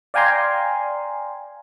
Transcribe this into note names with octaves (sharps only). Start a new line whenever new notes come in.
D5 F5 G5 G#5 A#5 C6